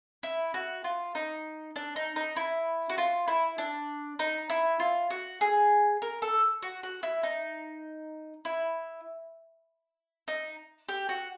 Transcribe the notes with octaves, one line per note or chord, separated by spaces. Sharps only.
E4
F#4
F4
D#4
D4
D#4
D#4
E4
F#4
F4
E4
D4
D#4
E4
F4
F#4
G#4
A#4
A4
F#4
F#4
E4
D#4
E4
D#4
G4
F#4